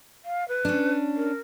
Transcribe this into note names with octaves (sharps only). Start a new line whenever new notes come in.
F5
B4
C#4 D4
A#4